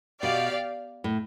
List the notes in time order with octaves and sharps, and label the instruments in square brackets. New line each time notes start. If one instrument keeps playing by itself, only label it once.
[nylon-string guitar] B2 [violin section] G4 D5 F5
[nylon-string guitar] A2